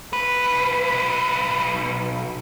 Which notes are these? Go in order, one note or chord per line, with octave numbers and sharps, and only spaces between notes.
B1 B4